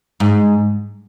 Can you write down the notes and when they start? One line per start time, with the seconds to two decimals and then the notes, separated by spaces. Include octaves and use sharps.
0.20 G#2